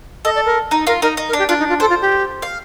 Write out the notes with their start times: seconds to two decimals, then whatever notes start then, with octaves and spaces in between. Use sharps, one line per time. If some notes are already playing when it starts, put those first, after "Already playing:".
0.25 A4 D#5
0.35 D5
0.46 A#4
0.71 D#4
0.87 F4 A#4
1.02 D#4 A#4
1.17 D#4
1.28 A#4
1.33 D4
1.39 G4
1.49 D4 F4
1.59 D#4
1.69 F4
1.80 A4 C5
1.90 F4
2.01 G4
2.42 F5